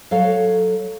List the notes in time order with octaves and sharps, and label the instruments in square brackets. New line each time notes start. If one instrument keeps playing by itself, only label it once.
[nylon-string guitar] F#3 A4 C#5 F5